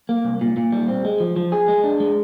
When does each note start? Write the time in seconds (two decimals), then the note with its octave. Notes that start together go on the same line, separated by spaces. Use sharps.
0.09 A#3
0.25 C2
0.41 A#2
0.57 A#2
0.72 G3
0.88 C4
1.05 G#3
1.20 F3
1.36 F3
1.52 G#4
1.68 G#3
1.84 D4
2.00 G#3